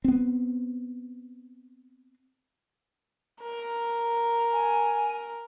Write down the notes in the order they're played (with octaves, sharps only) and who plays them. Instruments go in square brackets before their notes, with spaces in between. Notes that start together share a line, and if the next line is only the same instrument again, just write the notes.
[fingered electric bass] B3 C4
[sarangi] A#4
[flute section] G#5